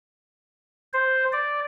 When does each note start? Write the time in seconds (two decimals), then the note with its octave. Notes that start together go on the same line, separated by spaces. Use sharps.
0.93 C5
1.33 D5